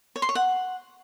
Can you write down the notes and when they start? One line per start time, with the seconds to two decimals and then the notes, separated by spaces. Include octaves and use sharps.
0.16 C#5
0.22 C6
0.29 C#5
0.35 F#5